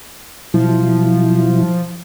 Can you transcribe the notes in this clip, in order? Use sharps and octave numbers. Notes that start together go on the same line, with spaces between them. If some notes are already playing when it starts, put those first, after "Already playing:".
B2 F3 F#3 E4